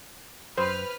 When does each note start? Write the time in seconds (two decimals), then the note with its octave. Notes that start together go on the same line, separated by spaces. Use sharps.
0.58 F#2 B4 C5 F6